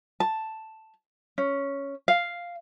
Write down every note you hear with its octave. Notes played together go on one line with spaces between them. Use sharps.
A5
C#4
F5